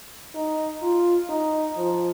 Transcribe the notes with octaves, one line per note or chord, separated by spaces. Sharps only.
D#4
F4
D#4
F3